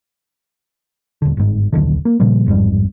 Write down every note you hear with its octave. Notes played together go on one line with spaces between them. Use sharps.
D#1 D3
G1 G#2
D#1 B1 D3 D#3
A#3
A#2 C#3 F3 G3
A1 F2 G#2 G3